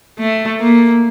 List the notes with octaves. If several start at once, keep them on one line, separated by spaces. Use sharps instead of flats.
A3
A#3